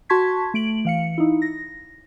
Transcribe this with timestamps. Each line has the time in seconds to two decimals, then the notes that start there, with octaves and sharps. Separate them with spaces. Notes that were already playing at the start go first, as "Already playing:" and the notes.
0.09 F#4 A5 C6 C#6 G#6 B6
0.54 A3 D7 F#7
0.85 E3 F5 C#7
1.18 D#4 E4
1.42 A#6